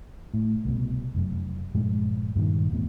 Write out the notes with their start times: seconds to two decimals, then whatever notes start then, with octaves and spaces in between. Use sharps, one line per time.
0.34 A2
0.65 C2 B2
1.15 F1 F#2
1.75 G2 A#2 F3 G#3
2.36 G2 A#2 D#3
2.71 D#1 E2 A2 B3